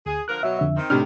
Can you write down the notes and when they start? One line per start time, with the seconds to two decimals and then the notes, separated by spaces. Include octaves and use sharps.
0.06 D2 G#4
0.28 D3 F3 A#4 F#6
0.43 B2 F#3 E5
0.59 F2 D3 E5
0.76 D#3 C4
0.90 A2 C3 D4 F6